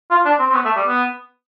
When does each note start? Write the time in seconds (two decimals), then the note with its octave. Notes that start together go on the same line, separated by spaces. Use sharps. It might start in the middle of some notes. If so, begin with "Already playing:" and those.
0.11 F4
0.25 D4
0.39 C4
0.50 C4
0.55 B3
0.65 A3
0.76 G3
0.87 B3